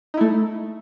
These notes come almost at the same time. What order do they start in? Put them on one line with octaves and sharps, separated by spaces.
D#4 E4 A3